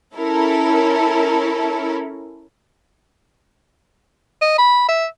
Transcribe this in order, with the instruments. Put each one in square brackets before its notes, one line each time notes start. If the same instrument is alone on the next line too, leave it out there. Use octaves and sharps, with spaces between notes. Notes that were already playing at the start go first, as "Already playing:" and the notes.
[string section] C#4 E4 A4 A#4
[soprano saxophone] D#5
B5
E5